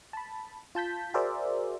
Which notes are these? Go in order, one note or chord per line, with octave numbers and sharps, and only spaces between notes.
A5 B5
F4 A5 G6 B6
F#4 G#4 A#4 C5 D5 E5